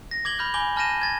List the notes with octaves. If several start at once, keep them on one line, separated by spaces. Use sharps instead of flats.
A#6
D6 G#6 F#7 G7
B5 F6 G6
G#5 B5 D6 G6 G7
A5 F6 G6 A#6 D#7 E7
G#6 A6